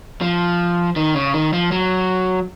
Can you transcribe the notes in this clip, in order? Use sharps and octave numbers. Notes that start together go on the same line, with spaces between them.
F3
D#3
C#3
D#3
F3
F#3